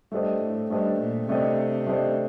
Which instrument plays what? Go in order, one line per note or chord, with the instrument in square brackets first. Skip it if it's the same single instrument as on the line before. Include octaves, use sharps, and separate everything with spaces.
[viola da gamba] G2 [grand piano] A3 D4 G4 C5 D#5
[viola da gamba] A2
[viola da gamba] G2 [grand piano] A3 D4 G4 C5 D#5
[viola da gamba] A#2
[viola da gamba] C3 [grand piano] A3 D4 G4 C5 D#5
[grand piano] A3 D4 G4 C5 D#5